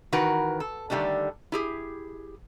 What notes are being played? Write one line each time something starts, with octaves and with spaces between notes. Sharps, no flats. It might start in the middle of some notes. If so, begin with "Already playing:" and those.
D#3 E3 F#4 A#4 B4
A4
D3 D#3 G3 A3 D4
E4 G4 G#4